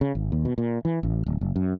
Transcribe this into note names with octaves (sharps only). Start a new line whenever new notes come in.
C#3
G#1
D#2
B2
A#2
E3
A1
D1
F#1
F#2